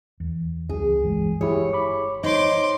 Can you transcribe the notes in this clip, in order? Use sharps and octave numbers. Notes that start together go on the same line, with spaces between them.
E2
C#2 C4 G#4
G1 E3 G#3
E4 G4 G#4 C#5
B5 D6
D#4 C5 C#5 C6 D6